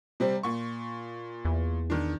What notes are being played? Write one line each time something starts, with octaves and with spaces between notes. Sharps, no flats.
C3 G3 C4
A#2 C#6
E2
D#3 D4